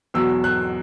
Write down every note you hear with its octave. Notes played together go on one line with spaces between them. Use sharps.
E2 B2 F#3 E6
F#6